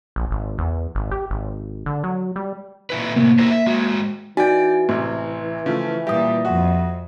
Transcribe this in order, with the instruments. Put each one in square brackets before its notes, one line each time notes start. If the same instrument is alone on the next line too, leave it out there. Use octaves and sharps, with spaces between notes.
[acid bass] A#1
G#1
E2
G#1
G4
G#1
D3
F#3
G3
[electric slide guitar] A#2 E4 B4
[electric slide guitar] A2 C3 [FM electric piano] A#3
[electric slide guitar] E4 A#4 C5
E5
G#3 F#4
[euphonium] E3 [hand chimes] D#4 F#4 G#5 [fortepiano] D5 G5
[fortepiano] A1 C3 [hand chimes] C6
[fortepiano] C#3 F3 A3
[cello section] A#2 G3 [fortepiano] G4 [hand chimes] E5 D#6
[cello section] F2 [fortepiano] F#4